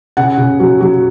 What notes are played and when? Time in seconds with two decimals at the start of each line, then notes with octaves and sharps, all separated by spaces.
0.17 C#3 F#5
0.38 C#3
0.60 F#3
0.81 F#3